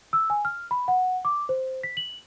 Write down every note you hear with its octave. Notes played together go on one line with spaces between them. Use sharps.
E6
G#5
F6
B5
F#5
D6
C5
B6
F#7